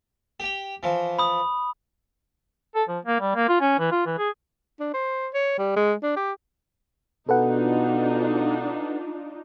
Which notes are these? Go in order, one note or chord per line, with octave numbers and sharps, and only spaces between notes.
G4 G5
E3 F3
B5 D#6
A4
F3
A#3
G3
A#3
F4
C#4
E3
F4
E3
G#4
D4
C5
C#5
G3
G#3
D4
G4
B2 D4 D#4 F4 A4 B4 F#5